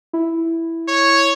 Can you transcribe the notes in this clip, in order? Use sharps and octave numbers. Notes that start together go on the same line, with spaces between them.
E4
C#5